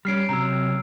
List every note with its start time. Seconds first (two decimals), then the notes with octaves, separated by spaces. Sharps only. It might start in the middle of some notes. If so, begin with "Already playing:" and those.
0.05 G3 C#4 F6 C7 D7
0.29 C3 F#3 A#5 E6